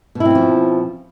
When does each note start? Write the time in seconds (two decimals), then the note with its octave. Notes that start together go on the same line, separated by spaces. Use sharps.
0.15 B2
0.20 E4
0.25 C4
0.30 C#4
0.35 F3